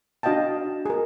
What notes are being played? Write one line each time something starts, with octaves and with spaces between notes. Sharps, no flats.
D4 F#4 D#5 F5 G5 A5
G#4 A#4